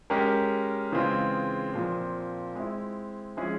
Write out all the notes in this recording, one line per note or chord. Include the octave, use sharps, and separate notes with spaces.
G#3 C#4 G4 A#4
C#3 E3 G#3 C4 F4
A#2 F3 C4
G#3 C4 E4
F3 G#3 C#4 E4 G#4